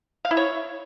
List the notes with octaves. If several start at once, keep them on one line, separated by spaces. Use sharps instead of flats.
F5
E4
C#5